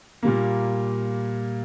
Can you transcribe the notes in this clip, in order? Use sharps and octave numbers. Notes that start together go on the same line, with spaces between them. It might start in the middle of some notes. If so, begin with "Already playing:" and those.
A#2 G3 A#3